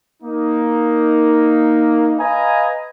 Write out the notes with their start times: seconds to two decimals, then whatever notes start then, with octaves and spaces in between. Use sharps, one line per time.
0.23 A#3 D#4
2.19 B4 D#5 F5 G#5 A#5